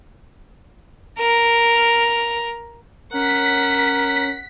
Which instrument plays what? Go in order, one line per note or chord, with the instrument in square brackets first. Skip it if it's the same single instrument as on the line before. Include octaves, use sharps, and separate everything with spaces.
[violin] A#4 F7
[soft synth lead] C#4 [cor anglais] A#4 [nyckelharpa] F#5 [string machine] B6